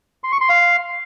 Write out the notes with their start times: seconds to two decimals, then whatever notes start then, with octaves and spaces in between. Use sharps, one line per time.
0.24 C6
0.32 C#6
0.41 C6
0.49 F5